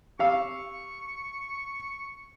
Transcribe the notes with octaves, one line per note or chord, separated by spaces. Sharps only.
G4 F5 C#6 E6